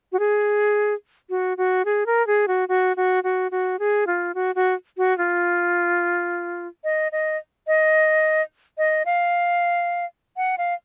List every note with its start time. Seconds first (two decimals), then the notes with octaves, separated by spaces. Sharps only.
0.12 F#4
0.19 G#4
1.30 F#4
1.57 F#4
1.85 G#4
2.06 A#4
2.27 G#4
2.48 F#4
2.69 F#4
2.97 F#4
3.24 F#4
3.51 F#4
3.79 G#4
4.07 F4
4.35 F#4
4.55 F#4
4.97 F#4
5.18 F4
6.84 D#5
7.12 D#5
7.67 D#5
8.78 D#5
9.06 F5
10.37 F#5
10.58 F5